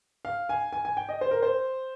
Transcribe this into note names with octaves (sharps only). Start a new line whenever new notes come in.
F5
G#5
G#5
G#5
G5
D#5
C5
A#4
C5